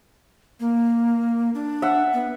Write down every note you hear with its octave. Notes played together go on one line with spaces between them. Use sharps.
A#3
D4
E5 F#5
B3